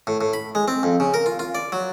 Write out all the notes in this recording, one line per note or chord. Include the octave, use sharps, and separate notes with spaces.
A2
A2
B5
G#3
C4
F2
C#3
A#4
F4
F4
D5
F#3